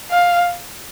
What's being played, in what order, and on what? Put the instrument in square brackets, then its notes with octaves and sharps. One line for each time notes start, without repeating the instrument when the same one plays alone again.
[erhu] F5